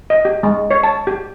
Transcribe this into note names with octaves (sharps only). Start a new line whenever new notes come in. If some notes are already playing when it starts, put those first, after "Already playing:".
D#5
G4
G#3
C#5
A5
G4